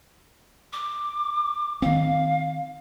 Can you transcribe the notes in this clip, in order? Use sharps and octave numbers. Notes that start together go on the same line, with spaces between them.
D6
D#3 C4 F5